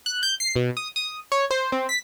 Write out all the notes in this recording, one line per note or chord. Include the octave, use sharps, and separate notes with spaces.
F#6
G6
C7
B2
D#6
D#6
C#5
C5
C4
B6